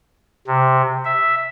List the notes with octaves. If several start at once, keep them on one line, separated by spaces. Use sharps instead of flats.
C3
E5